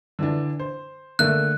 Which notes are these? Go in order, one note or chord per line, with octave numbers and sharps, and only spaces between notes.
D3 E3 D4
C5
D3 A3 A#3 F#6